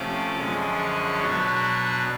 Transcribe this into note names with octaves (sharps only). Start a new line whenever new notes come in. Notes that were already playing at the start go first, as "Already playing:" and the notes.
Already playing: C3 F3 A3 C#4 D6
F#2 D3 F3 G#3 C#4
C#6
B2 F#3 B3 D4 C#6